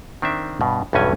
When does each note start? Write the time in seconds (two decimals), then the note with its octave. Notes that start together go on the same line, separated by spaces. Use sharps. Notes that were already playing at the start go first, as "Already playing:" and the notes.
0.22 D#3 C4 D4 E5
0.61 G2 B2
0.93 B1 E2 G2 E3 C#4 G#5